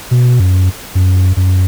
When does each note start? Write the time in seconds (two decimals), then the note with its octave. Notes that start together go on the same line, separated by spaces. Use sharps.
0.11 B2
0.40 F#2
0.95 F#2
1.37 F#2